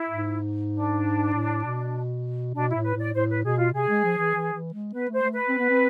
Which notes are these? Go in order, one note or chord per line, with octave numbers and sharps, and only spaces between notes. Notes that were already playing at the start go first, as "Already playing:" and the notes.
Already playing: E4
G#2
D4
A2
B2
B2 D4
E4
A2
B4
A2
D5
A2 C5
B4
B2 G#4
F4
C3 G#4
G#3
F3
E3
E3
E3
G#3
B3 B4
A3 C5
A3
B4
C4
B3
C4